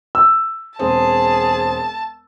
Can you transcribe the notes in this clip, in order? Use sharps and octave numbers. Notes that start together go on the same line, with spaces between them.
E6
E1 C4 G#4 A5